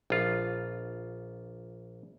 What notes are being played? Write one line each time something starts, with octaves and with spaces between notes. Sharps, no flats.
A#1 F4